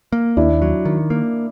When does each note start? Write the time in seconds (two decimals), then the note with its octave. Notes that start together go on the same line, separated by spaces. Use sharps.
0.13 A#3
0.37 D#2 D4 E4
0.62 F#3
0.85 D#3
1.10 A#3